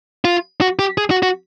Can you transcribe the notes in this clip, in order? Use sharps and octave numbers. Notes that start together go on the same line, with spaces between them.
F4
F#4
G4
G#4
F#4
F#4